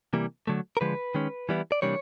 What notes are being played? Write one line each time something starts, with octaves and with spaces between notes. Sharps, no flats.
C3 E3 G3 A#3
D3 F#3 A3
A#4
D3 F3 G#3 B4
D#3 G#3 C#4
E3 G3 B3 E4
D5
C3 E3 G3 A#3 D4 C#5